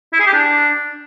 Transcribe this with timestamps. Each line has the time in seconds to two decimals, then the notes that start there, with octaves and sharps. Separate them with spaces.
0.13 E4
0.20 G#4
0.26 G4
0.33 D4